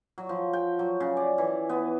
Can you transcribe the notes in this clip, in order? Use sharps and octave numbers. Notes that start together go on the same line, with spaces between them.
F#3
F3
G5
F#3
C#3
D5
E3
B3